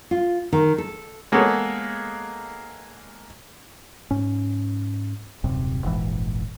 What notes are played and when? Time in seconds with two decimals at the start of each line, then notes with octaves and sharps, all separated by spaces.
0.11 F4
0.53 D#3
0.78 A4
1.32 G#3 A#3 B3 G#4 A4 C#5
4.11 G#2 C#4
5.44 D#1 F#2 C3
5.83 F1 A#1 G#2 E3